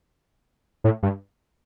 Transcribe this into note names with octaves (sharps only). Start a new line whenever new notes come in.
A2
G2